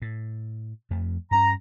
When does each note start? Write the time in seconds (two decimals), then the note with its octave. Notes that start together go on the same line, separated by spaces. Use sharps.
0.02 A2
0.90 F2 F3 A3
1.31 G2 C#4 A#5